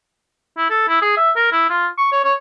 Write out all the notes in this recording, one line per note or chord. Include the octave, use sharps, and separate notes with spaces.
E4
A4
E4
G#4
E5
A#4
E4
F4
C#6
C#5
C#5